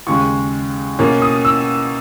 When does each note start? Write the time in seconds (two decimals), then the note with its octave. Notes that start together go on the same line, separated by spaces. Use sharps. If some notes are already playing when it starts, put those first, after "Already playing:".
0.07 D#2 C#3 G#3 C#6
0.99 B2 A#3 C#4
1.22 D#6
1.45 E6